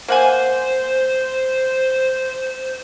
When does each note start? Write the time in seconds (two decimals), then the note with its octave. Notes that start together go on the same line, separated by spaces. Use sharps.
0.08 A#3 C5 F#5 G#5